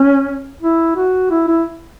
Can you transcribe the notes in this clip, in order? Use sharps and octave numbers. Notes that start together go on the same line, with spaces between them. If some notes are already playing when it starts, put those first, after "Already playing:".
Already playing: C#4
E4
F#4
E4
E4